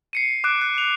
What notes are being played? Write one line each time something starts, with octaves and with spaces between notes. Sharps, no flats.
C7 C#7 D#7
D6 F#6 D7
F#6
F7